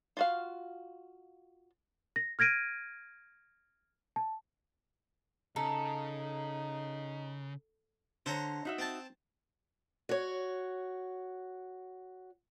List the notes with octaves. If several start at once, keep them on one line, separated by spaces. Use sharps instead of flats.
F4 F#4 F5
A#6
F6 G#6 A#6 D7 D#7
A5
C#3 D#4 A4 A#5
D3 C5 C#5 A#5
D#4 F#4 E5
C4 A5
F#4 C#5